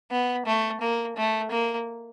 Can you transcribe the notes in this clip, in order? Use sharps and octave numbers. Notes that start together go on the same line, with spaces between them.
B3
A3
A#3
A3
A#3